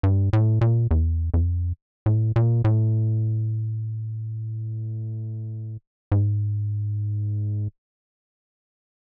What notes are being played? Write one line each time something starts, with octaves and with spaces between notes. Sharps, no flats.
G2
A2
A#2
E2
F2
A2
A#2
A2
G#2